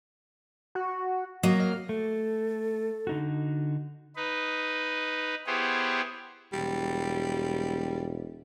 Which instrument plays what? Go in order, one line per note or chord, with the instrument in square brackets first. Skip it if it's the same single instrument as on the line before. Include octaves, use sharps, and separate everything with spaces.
[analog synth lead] F#4
[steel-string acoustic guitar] F#3 A#3 [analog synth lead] D#5
[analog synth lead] F6
[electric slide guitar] A3 [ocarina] A4
[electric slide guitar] D3 D#4 F#4
[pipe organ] D#4 B4
B3 E4 G4 G#4 C5 C#5
[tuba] E1 [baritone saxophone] G3